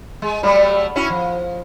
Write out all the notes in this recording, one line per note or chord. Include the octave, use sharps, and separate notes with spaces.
G#3
F#3 G3 A3
C#4 E4 F#4
F3